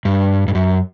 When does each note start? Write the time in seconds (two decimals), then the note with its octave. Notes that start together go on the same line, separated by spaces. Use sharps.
0.05 G2
0.48 G2
0.55 F#2